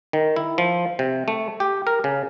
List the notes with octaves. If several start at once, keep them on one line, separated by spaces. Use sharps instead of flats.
D#3
E4
F3
C3
A3
G4
A#4
C#3